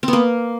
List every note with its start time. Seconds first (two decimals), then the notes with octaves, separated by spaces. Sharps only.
0.03 C4
0.08 B3
0.13 A#3